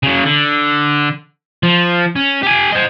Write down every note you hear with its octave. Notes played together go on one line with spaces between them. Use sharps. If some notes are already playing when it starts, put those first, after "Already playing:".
C#3 F#3
D3
F3
C#4
G4 G#5
C5 D#5